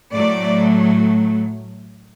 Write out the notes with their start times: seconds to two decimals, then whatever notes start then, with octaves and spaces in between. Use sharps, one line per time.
0.14 A2 F#3 A3 D5